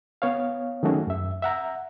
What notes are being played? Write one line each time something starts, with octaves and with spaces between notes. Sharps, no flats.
B3 C#5 F5
D#3 F#3 A3 C#4 F#4 G#4
F#2 E5
E5 F#5 A#5